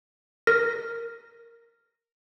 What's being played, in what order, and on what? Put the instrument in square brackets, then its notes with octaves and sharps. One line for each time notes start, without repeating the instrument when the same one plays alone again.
[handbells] A#4 A#6